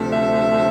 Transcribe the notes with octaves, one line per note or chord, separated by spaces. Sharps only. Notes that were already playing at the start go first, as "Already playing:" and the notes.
Already playing: D2 C3 F3 A3
E5